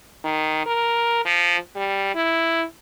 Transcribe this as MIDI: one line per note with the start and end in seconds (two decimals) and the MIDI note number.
0.24 0.61 51
0.66 1.21 70
1.25 1.56 53
1.76 2.12 55
2.15 2.64 64